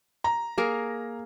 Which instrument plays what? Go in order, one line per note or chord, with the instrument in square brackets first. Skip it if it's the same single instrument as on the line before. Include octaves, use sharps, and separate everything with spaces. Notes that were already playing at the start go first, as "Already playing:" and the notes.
[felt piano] A#5
[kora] A#3 G#4 A#4